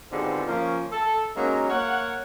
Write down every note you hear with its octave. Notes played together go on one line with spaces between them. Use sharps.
G#2 B2 D3 C4 F4 G4
F3 A#3 C#4
A4
F#3 G#3 A#3 C#4 D#4 A#4
A#3 C#5 F#5